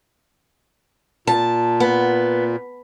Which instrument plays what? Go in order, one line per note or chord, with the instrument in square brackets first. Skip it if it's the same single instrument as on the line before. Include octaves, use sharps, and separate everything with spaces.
[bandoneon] A#2 [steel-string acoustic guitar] A5
[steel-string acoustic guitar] B3